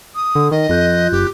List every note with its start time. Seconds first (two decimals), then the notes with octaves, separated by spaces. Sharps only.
0.15 D#6
0.35 D3
0.51 D#3 D#5
0.69 F2 F4 F#6 G6
1.12 F#1 G4